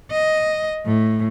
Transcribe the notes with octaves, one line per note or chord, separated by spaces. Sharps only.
D#5
A2